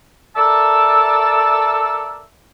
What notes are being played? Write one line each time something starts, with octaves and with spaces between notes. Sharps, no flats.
A4 A#4 D5 E5 A5 E6